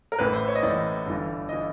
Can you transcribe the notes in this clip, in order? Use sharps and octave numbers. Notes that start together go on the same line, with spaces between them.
A#4
A1 A2 E3 B4
C5
C#5
D#5
A1 A2 E3 D5
G1 G2 E3
E3 D#5